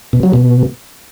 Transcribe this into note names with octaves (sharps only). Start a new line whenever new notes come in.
B2
F#3
B2